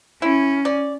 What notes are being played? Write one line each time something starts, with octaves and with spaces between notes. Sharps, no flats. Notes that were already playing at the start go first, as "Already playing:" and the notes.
C#4 E4
D5